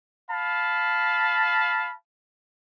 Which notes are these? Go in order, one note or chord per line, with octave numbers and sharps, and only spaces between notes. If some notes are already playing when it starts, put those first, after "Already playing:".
F5 A5 B5